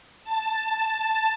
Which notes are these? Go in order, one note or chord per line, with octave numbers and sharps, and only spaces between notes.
A5